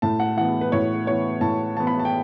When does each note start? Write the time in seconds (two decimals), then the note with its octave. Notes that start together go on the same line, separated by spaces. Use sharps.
0.02 A2 A5
0.20 F#5
0.37 E3 B3 F#5
0.61 B4
0.72 A2 C#5
1.07 E3 B3 C#5
1.41 A2 A5
1.77 E3 B3 A5
1.87 B5
1.99 A5
2.05 G5